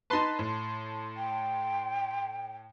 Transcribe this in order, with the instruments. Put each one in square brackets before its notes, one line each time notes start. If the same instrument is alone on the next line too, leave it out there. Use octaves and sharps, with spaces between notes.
[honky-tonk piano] D#4 B4 [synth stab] A5 C6
[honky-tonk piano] A2
[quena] G5